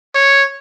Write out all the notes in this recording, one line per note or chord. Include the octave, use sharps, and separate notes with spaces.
C#5